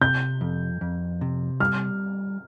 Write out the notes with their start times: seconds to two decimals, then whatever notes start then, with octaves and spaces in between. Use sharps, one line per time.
0.01 C3 G6
0.41 F2
0.81 F2
1.21 C3
1.60 G3 F6